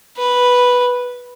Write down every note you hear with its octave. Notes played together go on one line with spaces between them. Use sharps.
B4